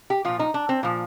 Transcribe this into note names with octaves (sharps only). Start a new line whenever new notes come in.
G4
A#2 F3 F4
D#4
D4
C4
A#2 F3